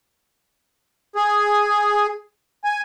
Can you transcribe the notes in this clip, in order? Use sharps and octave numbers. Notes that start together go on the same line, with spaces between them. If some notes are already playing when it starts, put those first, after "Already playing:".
G#4
G#5